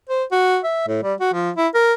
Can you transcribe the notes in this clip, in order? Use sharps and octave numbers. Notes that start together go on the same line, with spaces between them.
C5
F#4
E5
A2
G3
F#4
F3
E4
A#4